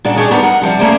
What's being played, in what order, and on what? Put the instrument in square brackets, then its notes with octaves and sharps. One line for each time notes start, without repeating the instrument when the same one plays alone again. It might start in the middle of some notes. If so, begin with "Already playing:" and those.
[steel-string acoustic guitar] A#2 C#3 D4 F#4
D4 G4 G#4 C#5 D#5
B3 D4 D#4 F#4 A#4 B4
A#4 D#5 F#5
C3 F3 G3 F#4
F3 A3 A#3 C#4 C5 D5